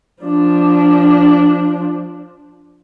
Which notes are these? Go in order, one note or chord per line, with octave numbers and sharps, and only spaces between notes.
F3 D4